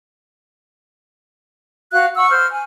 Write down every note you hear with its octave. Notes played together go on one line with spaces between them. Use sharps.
F#4 F5 F#6
F#5 C#6 E6
C5 F6
G#5